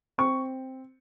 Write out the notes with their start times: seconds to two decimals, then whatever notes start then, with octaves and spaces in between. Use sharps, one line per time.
0.18 C4 C#6